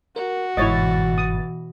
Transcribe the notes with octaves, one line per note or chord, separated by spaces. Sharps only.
F#4 A#4
G1 G#2 B2 E3 E4 C#5 D#5 A6
D#6